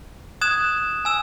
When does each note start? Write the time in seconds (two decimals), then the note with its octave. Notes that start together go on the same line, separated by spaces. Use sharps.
0.41 D#6 F#6 G#6 E7
1.05 G#5 E6 E7